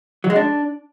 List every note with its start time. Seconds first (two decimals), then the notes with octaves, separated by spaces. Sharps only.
0.24 F#3
0.30 G#3
0.36 D4